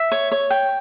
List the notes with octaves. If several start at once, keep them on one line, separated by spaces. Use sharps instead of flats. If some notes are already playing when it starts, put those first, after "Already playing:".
Already playing: E5
C#5
C#5
G5